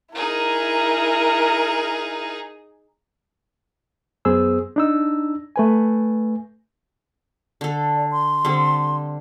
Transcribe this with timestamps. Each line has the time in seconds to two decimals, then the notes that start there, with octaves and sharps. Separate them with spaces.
0.15 D#4 E4 G#4 A#4
4.25 F#2 B3 G#4 C5 E6
4.76 D4 D#4 E6
5.56 A3 B4 G#5
7.61 D3 A4
7.96 D5
8.11 C6
8.45 D3 G3 C4